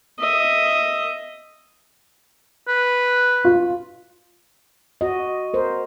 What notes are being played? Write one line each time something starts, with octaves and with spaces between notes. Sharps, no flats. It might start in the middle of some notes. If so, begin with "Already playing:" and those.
D#5 E5
B4
F4
F#4 D#5
A#4 C5